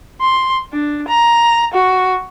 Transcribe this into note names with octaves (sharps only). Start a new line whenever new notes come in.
C6
D4
A#5
F#4